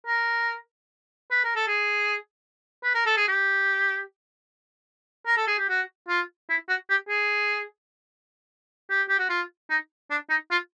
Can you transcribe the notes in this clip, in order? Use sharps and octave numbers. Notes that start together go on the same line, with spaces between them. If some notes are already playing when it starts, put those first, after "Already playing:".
A#4
B4
A#4
A4
G#4
B4
A#4
A4
G#4
G4
A#4
A4
G#4
G4
F#4
F4
E4
F#4
G4
G#4
G4
G4
F#4
F4
D#4
D4
D#4
F4